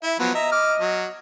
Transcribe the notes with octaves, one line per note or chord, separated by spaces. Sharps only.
E4 E5
F3 F#3 B3 B4
D#5 E5 A#5
D6 F6
F#3